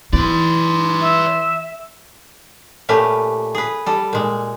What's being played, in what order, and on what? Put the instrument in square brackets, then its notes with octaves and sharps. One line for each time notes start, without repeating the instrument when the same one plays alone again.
[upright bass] E3 [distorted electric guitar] B4 D5 [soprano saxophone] C6
[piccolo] E5
[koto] A#2 A3 C#4 G4 B4
G#4 B4
G3 A4
A#2 G#3